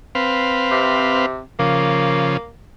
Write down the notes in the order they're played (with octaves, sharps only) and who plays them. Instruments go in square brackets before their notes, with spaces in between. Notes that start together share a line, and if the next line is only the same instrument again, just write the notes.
[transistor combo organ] C4 B4 F5
[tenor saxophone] C3
[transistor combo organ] C#3 F3 [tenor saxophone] A#3